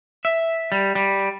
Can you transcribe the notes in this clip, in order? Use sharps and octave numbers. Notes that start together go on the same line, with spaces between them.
E5
G3
G3